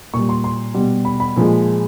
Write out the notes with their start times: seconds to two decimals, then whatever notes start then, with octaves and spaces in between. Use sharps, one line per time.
0.14 A#2 C#6
0.19 G3
0.29 C6
0.44 C6
0.74 B2 G3
1.05 B5
1.20 B5
1.36 A#2 F3 G#3